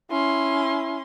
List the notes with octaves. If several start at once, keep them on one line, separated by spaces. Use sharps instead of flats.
C#4 E4 C6